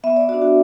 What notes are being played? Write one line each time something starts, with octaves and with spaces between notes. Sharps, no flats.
B3 E5
D5
D4 F#4 D5
F#4